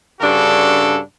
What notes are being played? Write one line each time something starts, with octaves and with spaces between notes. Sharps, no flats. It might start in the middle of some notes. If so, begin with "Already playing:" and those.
G2 C#3 D4 F#4 A4